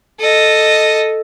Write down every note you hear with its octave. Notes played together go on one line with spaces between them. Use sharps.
A4 D#5